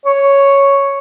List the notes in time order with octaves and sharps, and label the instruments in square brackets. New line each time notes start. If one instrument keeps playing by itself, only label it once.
[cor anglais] C#5